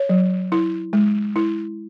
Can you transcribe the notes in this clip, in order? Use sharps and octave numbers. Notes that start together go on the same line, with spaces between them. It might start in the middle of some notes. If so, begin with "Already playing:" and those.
Already playing: C#5
F#3
E4
G#3
E4